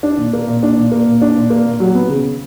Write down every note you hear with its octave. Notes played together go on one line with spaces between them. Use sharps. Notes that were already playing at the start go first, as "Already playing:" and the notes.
D4
A#2
A#3
A#2
D4
A#2
A#3
A#2
D4
A#2
A#3
A#2
F#3
B3
C#3